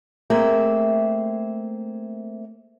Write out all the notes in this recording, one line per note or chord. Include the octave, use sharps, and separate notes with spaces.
A3 A#3 C4 G#4 E5